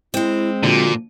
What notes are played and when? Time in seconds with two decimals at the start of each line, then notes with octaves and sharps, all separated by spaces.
0.14 G#3 C4 E4
0.63 A#2 D3 F3 F#4